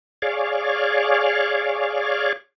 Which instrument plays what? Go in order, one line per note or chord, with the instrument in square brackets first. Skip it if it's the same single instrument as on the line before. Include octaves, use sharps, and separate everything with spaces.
[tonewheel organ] G#4 C#5 D5 F5